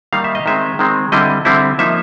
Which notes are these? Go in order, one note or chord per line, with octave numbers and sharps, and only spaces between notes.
D#3 G3 A#3 D#4 F5
E5
D#5
D#3 G#3 C4 E5
D#3 G#3 C4
D3 G3 C4 E4 D#5
D3 G3 C4 E4
F3 A#3 D#4 E5